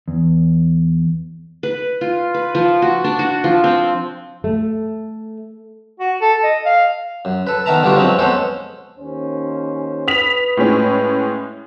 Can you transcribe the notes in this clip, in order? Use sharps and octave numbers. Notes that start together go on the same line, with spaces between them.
E2
B4
F4
B4
F3
F#4
D4
F#4
F3
C4
A3
F#4
A4
D#5
F5
F#2
A4 B4
D#3 B3 A#4 E5 A5 A#5
D3 G3 B3 D4 F4 F#4
F3 F#3 G#3 C4 C#4
G#3 B3 C#4 A4 C5
D#2 C#4 C5
B4 D#6 B6 F7
A2 G#3 C#4